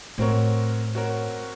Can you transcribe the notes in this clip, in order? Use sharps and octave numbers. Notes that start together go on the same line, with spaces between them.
A2 C4 F#4 A#4 C#5
C4 F#4 A#4 C#5